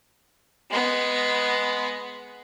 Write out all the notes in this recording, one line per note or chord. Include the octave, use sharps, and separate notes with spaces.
G#3 B3